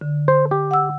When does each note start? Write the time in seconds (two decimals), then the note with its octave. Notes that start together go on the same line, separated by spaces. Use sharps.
0.01 D3
0.28 C5
0.51 G4
0.71 F#5 E6